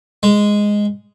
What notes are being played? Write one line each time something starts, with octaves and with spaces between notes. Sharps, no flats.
G#3